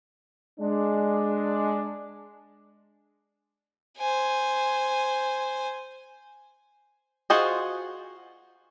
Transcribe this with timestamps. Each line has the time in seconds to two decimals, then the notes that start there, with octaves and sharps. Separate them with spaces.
0.60 G#3 D4
3.98 C5 G#5
7.30 F4 F#4 G#4 C5 D#5